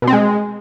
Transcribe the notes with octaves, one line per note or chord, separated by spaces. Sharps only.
B2
C4
G#3